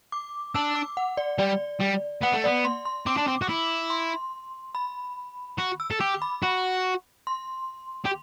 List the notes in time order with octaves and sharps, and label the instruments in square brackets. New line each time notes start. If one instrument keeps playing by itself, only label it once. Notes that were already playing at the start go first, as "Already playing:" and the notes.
[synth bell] D6
[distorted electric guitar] D4 [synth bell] E6
[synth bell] D6
F#5
D5
[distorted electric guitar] G3 [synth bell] D5
[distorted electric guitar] G3
[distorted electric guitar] B3 [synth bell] F#5
[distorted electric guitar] A3
[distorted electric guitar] B3 [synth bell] D5
[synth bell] C6
C6
[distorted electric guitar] C4 [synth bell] D6
[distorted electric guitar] D4
C4
F#4
E4
[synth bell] C6
B5
[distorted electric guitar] F#4
[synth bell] E6
[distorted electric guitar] A4
[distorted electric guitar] G4 [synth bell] D6
[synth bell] B5
[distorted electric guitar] F#4
[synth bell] C6
[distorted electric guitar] G4